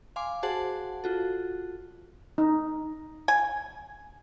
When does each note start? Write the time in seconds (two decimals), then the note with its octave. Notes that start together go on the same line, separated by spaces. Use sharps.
0.16 F5 G#5 C6 D6
0.43 F#4 G#4 C5 F#5 A5
1.04 F4 F#4 A4
2.38 D#4
3.28 G#5